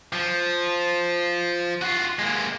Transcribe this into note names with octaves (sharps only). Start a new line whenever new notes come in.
F3
F4 F#4
G#3 A#3